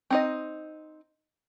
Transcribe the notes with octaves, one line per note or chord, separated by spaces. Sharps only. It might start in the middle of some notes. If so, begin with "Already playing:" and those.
C4 D#4 D#5